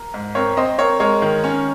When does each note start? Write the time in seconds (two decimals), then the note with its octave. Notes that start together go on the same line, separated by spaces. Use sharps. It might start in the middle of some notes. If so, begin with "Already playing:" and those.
Already playing: A#4
0.14 G#2
0.35 C4 A#4 C#5
0.57 C4 C5 D#5
0.78 C4 A#4 C#5
1.00 G#3 A#4 C#5
1.22 D#3
1.44 C#4